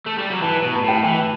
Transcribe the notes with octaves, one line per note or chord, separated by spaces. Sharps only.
A3
G3
F#3
E3 A5
B2 A5
A5
A2 G5
E3 G5